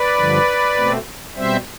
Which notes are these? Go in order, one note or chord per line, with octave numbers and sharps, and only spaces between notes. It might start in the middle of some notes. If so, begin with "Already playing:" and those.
Already playing: B4 D5
G2 D3 F3
B2 A3 C4
B2 G3 C4 C5 E5